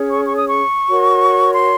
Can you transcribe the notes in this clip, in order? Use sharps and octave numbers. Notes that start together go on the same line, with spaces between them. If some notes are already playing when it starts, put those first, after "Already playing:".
Already playing: C#4 G#4 C#5
C#6
C#6
D#6
C#6
F#4 A#4 C#5
C6